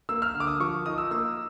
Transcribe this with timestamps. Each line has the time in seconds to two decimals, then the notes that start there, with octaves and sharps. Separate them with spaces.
0.09 A#3 E6
0.22 F6
0.34 D3
0.40 D6
0.47 D#6
0.60 F3 C#6
0.86 D#4 D#6
0.98 E6
1.11 A#3 E6